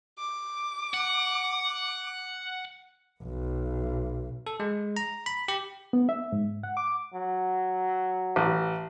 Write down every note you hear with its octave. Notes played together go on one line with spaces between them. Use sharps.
D6
F#5
B1
A4
G#3
A#5
B5
G4
B3
E5
G#2
F#5
D6
F#3
A1